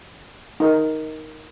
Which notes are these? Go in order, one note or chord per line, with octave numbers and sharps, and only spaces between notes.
D#4 A#4